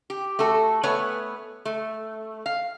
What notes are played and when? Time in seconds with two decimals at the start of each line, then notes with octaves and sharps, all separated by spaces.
0.10 G4
0.39 A3 F#4 A4
0.83 A3 B3 B4 C#5 G#5
1.65 A3
2.46 F5